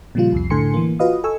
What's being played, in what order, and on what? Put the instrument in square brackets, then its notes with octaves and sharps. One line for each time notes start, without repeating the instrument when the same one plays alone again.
[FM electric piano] A#2 C#3 F3 G3 F4
C2 F2 C7
A2 D3 A4 G#5 C6 C#7
E3 A#3
F4 F#4 B4 D#5 F5 D#6
A4 G#5 C#6 E6